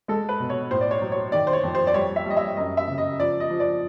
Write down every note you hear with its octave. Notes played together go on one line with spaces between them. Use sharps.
G#3 A4
B4
B2
C#5
A2 C5
D5
C#5
F#3
C#5
D#3 D5
C5
C#5
F2
C5
D5
G3 C#5
E5
G3 D#5
E5
F#2 D#5
E5
C#3
D#5
F3 D5
D#5
F3
D5